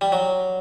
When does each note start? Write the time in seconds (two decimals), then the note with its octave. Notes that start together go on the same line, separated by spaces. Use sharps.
0.01 G3
0.12 F#3